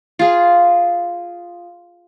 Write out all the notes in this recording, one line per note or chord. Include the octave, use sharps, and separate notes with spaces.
F4 G#4